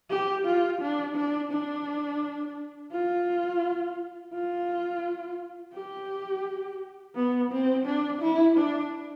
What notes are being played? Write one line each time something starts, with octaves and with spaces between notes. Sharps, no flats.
G4
F4
D4
D4
D4
F4
F4
G4
B3
C4
D4
E4
D4